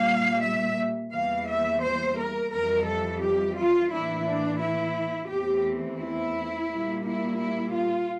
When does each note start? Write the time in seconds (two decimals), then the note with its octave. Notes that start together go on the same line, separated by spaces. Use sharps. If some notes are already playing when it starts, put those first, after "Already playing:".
Already playing: A#2 G3 A#3 F5
0.43 E5
1.12 E2 E3 G3 A#3 F5
1.47 E5
1.82 C5
2.17 A#4
2.51 F2 E3 G3 A#4
2.86 A4
3.21 G4
3.56 F4
3.91 A2 E3 A#3 D4 E4
4.26 D4
4.61 E4
5.30 E2 E3 A3 C4 G4
6.00 E4
6.70 A#2 G3 A#3
7.05 E4
7.39 E4
7.74 F4